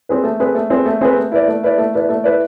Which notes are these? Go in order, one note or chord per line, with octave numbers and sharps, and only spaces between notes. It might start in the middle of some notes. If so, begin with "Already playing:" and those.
C4 G#4 B4
A3
C4 G#4 B4
A3
C4 G#4 B4
A3
C4 G#4 B4
A3
E4 B4 D5
A3
E4 B4 D5
A3
E4 B4 D5
A3
E4 B4 D5